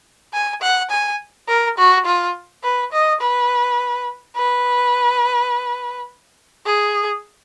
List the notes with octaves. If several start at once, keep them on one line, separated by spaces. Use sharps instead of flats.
G#5
F#5
G#5
A#4
F#4
F4
B4
D#5
B4
B4
G#4